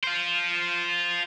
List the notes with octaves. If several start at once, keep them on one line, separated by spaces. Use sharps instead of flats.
F4 C5